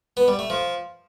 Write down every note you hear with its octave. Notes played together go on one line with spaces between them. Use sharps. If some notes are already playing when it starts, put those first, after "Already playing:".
B3
G3
A3
F3